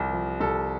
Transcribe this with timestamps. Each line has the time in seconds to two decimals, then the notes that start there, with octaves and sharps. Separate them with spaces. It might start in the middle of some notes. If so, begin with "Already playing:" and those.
Already playing: C2 F3 G4
0.13 F3
0.40 C2 A4